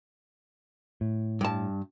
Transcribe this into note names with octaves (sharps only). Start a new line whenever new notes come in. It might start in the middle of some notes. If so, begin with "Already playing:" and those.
A2
G2 A5